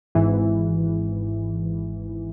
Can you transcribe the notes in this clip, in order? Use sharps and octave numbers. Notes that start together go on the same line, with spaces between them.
G#1 G#2 E3